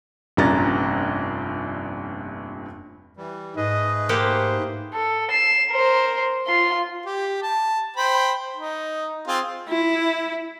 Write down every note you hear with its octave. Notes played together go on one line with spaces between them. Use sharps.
F1 A#1 G2 C#4 A#5 A6
E3 G3
G#2 A3 G#4 B4 D#5
A#3 G4 C5 F#5
A4
C7 E7
A#4 C5
F4 C6
G4
A5
C5 G5 B5
D#4
C4 F4 G#4
E4